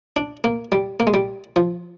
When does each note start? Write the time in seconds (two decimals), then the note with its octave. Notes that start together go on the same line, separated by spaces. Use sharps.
0.16 D4
0.44 A#3
0.72 G3
1.00 A#3
1.07 G#3
1.14 G3
1.56 F3